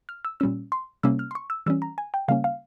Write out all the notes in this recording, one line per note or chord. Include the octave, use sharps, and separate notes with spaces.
F6
E6
A#2 G3 C#4 E6
C6
C3 G3 A#3 C#4 E6
F6
C6
C#6
E6
E3 G3 C#4 E6
A#5
G#5
G5
C#3 G3 A#3 C#4 F5
F5